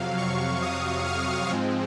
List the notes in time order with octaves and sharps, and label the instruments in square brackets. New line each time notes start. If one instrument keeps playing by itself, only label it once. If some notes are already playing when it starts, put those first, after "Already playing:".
Already playing: [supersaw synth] F2 C3 F#3 F5
C#6
D#6
F6
G#2 F3 G#3 C4